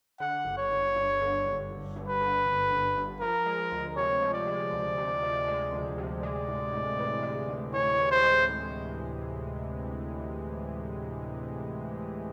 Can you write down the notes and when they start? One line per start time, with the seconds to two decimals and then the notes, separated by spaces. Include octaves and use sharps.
0.20 D3 F#5
0.45 G1
0.58 C#5
0.71 G1
0.96 G2
1.21 D3
1.45 G1
1.71 G1
1.96 G2
2.08 B4
2.21 D3
2.46 G1
2.71 G1
2.97 G2
3.21 F3 A#4
3.46 G#3
3.72 D2
3.96 C3 C#5
4.22 F3
4.34 D5
4.47 G#3
4.72 D2
4.98 C3
5.23 F3
5.48 G#3
5.72 D2
5.98 C3
6.22 G#3 D5
6.49 A2
6.73 A2
6.99 E3
7.23 G#3
7.49 A2
7.73 A2 C#5
7.99 E3
8.12 C5
8.23 G#3
8.49 A2